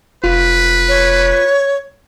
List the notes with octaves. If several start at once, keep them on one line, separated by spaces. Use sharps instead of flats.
F1 F4 B4
C#5